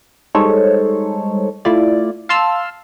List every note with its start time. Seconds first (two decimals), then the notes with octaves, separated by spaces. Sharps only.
0.35 G3 G#3 D#4 A4 C5 C#5
1.65 A3 E4 F4 D5
2.29 F5 A5 C6 E6 F6